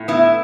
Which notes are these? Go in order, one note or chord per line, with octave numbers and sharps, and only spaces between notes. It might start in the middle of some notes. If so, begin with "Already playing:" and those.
Already playing: A2
B3 E4